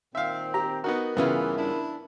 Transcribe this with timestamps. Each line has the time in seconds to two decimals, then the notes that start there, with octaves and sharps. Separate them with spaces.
0.15 A#2 D#3 C4 E5 F5
0.54 G4 A#5
0.84 B3 D#4 F#4 A#4
1.17 G2 C#3 E3 B3 C#4 F4
1.57 D4 E4